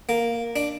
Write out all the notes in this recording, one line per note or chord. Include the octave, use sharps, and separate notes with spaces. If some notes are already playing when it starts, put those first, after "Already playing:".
A#3
D4